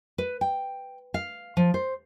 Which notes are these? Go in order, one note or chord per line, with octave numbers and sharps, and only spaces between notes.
B4
G5
F5
F3
C5